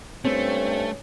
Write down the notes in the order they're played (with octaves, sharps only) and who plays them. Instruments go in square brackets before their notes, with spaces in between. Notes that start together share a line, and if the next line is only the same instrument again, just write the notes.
[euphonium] G2 [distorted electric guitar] A3 [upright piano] C4 [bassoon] C#4